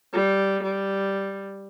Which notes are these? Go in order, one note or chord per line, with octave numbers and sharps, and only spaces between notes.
G3
G3